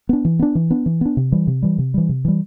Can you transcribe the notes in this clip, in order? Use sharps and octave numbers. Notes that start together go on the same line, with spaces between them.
B3 D4
E3
B3 D4
E3
B3 D4
E3
B3 D4
C3
E3 G3
C3
E3 G3
C3
E3 G3
C3
E3 G3